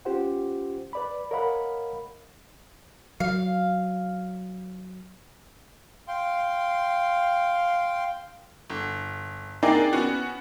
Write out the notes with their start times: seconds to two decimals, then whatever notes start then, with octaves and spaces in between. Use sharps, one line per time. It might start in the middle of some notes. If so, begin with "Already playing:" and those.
0.05 C#4 F4 G4 C5 F#5
0.93 B4 D5 B5
1.31 A#4 C#5 D#5 F5 F#5 B5
3.20 F#3 F5
6.08 F5 G5 C6
8.70 G1
9.63 A#3 C4 D4 D#4 G#4 D5
9.93 B3 C#4 F#4